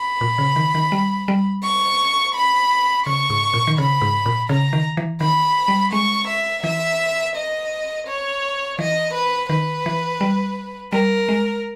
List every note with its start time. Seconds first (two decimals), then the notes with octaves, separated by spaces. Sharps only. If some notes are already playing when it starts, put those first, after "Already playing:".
Already playing: B5
0.21 A#2
0.38 C#3
0.56 D#3
0.75 D#3
0.92 G3
1.28 G3
1.63 C#6
2.35 B5
3.06 C#3 C#6
3.30 G#2
3.53 A#2
3.67 D#3
3.78 C#3 B5
4.01 G#2
4.26 A#2
4.49 C#3 A#5
4.73 D#3
4.97 E3
5.21 D#3 B5
5.68 G3
5.92 G#3 C#6
6.28 E5
6.63 E3 E5
7.36 D#5
8.07 C#5
8.79 E3 D#5
9.14 B4
9.49 D#3 B4
9.86 E3
10.21 G3
10.92 G3 A#4
11.29 G#3